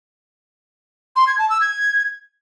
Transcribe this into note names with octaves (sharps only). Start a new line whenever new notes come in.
C6
G#6
A5
E6
G#6